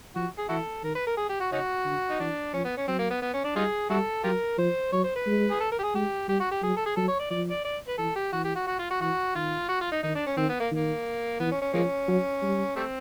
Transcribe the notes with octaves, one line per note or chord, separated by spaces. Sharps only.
F3 F#4
G#4
E3 E4 F#4 A4
D#3 A#4
B4
A#4
G#4
G4
F#4
C#3 C#4 D#4 F#4
D3
D#4
E3 D4
F3 C#4
B3
C#4
F#3 C4
A#3
B3
B3
C#4
D4
G3 D#4 F4 G#4
G3 E4 F#4 A4
F#3 F4 G4 A#4
F3 C5
F#3 C#5
C5
B4
G#3
G#4
A4
A#4
G4
G#4
G#3 G4
G3 G4
F#4
G4
F#3 G#4
A4
G#4
F#3 A4
C#5
D5
F3 D5
D5
D5
B4
E3 A4
G4
E3 F#4
G4
F#4
F#4
F4
F#4
E3 F#4
D#3 F4
F#4
F4
D#4
D#3 D#4
D4
C#4
D#3 C4
B3
A#3
D#3 A#3
E3 B3
C#4
C#4
F3 G#3 A#3 C#4
F#3
G3
G3 A3 C4